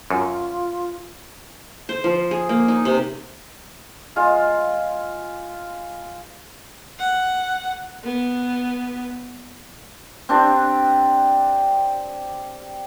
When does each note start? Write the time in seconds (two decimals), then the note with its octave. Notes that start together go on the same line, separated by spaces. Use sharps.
0.10 F#2 F4
1.89 C5
2.04 F3
2.31 G#4
2.49 A#3
2.68 D#4
2.85 C3
4.16 G#3 F4
6.99 F#5
8.04 B3
10.29 C4 D4 G4